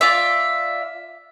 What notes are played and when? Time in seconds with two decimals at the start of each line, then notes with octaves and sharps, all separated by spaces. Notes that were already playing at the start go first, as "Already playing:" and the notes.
0.01 F4 D5 E5